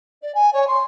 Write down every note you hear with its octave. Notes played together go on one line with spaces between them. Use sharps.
D5
G#5
C#5
C6